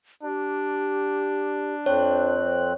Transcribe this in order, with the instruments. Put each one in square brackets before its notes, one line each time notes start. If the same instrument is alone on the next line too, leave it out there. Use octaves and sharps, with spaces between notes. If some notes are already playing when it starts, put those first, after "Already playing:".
[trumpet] D4 [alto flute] G4
[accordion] F2 C4 F#6 [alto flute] C5 [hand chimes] C#5